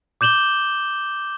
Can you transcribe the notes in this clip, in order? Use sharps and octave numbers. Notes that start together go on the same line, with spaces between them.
D6 G6 E7 F#7 G7